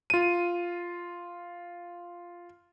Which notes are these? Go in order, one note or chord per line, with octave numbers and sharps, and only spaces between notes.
F4 D#7